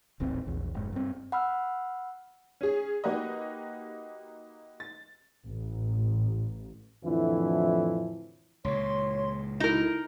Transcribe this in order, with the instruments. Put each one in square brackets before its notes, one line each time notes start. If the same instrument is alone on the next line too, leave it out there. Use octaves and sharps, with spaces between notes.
[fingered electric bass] D#1 A1 C4
A#1 E2
F1 G#2
G2 C4
[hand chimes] F#5 B5 E6 F6
[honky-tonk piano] C#4 G#4
A#3 D#4 F#4 G4 B4 D#5
A6
[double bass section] A1
[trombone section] F2 A2 D3 E3 F3 E4
[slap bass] C#2 A#2 [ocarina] C#5 [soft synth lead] C6
[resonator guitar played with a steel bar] D#4 A#4 [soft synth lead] E4 [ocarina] F#4